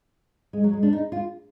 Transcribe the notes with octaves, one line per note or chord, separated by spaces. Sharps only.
G#3
F#3
G#3
D4
D#4
F4